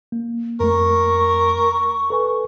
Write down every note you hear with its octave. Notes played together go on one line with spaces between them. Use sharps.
A#3
F2 A3 A#4 C#6
A4 B4 G#5